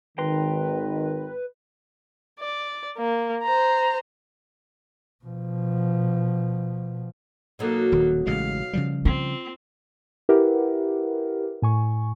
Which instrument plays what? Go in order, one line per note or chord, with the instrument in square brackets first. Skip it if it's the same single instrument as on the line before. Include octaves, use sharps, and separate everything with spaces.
[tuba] G#1 [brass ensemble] D#3 [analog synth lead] B4 [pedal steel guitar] G5 A#5 C6
[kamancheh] D5
A#3
C5 A#5
[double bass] B2 F3
[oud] B2 F#3 D#4 [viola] A#3 A4
[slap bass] D#1 D#3
[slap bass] A1 C#3 G#3 [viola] F5
[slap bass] C#3 F3 G3
[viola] C4 [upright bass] F4
[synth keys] E4 G4 A#4 B4 E5 F#5
A2 G#5 C#6